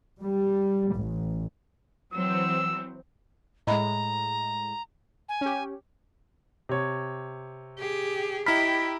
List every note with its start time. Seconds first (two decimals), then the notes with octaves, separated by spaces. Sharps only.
0.22 G3
0.95 A1
2.13 E3 F#3 C4 E6
3.67 A2 G#3 D#5 A#5 B5
5.29 G#5
5.41 C#4 G4
6.69 C3 C#5
7.79 G4 G#4
8.46 E4 G4 D#5 G5 A#5 B5 F6 B6